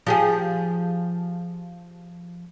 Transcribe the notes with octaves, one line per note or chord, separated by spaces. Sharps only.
F3 G4 G#4